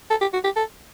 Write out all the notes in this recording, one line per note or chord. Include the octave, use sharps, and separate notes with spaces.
A4
G4
F#4
G4
A4